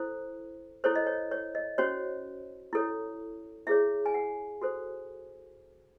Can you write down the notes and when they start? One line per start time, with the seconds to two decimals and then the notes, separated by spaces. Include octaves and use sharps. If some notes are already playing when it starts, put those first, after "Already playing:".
Already playing: E4 A4 C5
0.84 E4 A4 C5 C#5
0.95 D#5
1.07 C#5
1.31 C#5
1.55 D#5
1.78 C#4 F#4 C5 C#5
2.73 E4 A4 C#5
3.67 E4 G#4 C#5 E5
4.06 G#5
4.14 F#5
4.61 F#4 A4 C5